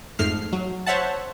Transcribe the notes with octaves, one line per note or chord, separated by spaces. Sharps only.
F2 G#2 A3 F6 C7
F#3
C5 C#5 E5 F#5 A5